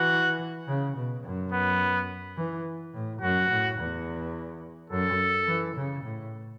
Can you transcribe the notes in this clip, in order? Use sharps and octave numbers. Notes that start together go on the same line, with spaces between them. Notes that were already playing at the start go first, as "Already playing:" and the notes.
Already playing: E3 F#4
C#3
B2
F#2
B3
E3
A2
F#2 F#4
A2
E2
F#2 A4
E3
C#3
A2